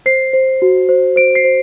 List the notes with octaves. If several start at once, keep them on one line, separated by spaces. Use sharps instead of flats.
C5 C7
C5
F#4
C5
C5 D7
C7
C5